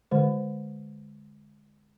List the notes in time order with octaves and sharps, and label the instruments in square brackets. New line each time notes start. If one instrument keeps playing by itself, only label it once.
[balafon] D3 G#3 C5